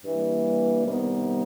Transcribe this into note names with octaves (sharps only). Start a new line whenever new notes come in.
G2 E3 G3 A#3
C3 D#3 G3 B3 D#4